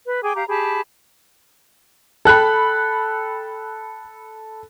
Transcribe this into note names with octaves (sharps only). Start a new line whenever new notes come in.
B4
G#4 G5 G#5 D6
G4 F5 A#5
G4 G#4 A5 B5
A4 G5 B5 F#6